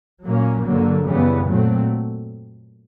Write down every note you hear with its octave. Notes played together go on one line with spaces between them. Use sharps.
A#2 F#3 A#3 C#4
G2 D3 F#3 A#3
F#2 C#3 E3 G3 B3
A#2 F#3 A3 C4